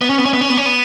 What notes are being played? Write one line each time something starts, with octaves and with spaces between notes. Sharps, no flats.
B3
C#4
B3
C#4
B3
C#4
B3
C#4
B3